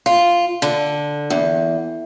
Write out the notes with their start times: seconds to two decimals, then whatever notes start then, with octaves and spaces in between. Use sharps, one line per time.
0.06 F4
0.62 D3
1.30 E2